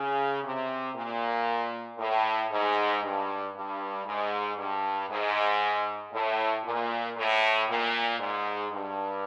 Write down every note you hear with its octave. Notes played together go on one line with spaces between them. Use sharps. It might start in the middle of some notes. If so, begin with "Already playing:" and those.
Already playing: C#3
C3
A#2
A2
G#2
G2
G2
G#2
G2
G#2
A2
A#2
A2
A#2
G#2
G2